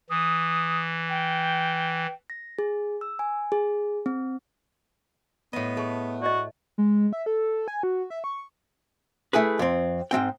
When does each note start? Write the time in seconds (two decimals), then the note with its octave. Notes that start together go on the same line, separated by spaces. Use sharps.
0.10 E3 D#6
1.09 G5
2.30 A#6
2.59 G#4
3.01 E6
3.19 G#5
3.52 G#4
4.06 C4
5.53 A2 B3 D#5
5.77 A3 G#4 C#6
6.22 F#4 D5 D#5
6.78 G#3
7.13 E5
7.26 A4
7.68 G#5
7.83 F#4
8.10 E5
8.24 C#6
9.33 A3 E4 G#4 B4
9.59 F2 C4
10.11 G#2 F#3 C4 G5